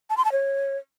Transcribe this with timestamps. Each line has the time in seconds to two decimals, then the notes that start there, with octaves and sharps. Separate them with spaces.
0.10 A5
0.17 C6
0.25 A5
0.32 C#5